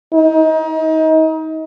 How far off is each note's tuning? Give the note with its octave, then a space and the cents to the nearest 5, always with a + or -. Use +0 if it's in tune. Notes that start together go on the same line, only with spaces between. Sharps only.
D#4 +30